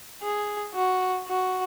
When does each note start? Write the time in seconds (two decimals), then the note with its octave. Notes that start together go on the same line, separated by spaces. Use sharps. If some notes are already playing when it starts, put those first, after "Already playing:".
0.22 G#4
0.75 F#4
1.27 F#4